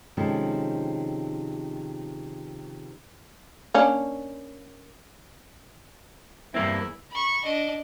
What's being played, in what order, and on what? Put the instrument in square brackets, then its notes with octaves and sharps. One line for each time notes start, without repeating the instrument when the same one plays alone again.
[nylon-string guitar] C3 D#3 F3 G#3 C#4 A4
[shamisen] A#3 C#4 D4
[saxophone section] E2 E4 [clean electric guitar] G2 A#3 C4
[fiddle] B5 C#6
D4 D#5